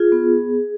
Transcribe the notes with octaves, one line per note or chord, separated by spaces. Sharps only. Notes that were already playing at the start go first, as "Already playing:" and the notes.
Already playing: F4 G#4
B3